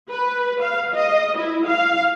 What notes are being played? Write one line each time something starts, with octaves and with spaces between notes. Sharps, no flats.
B4
F5
D#5
E4
F5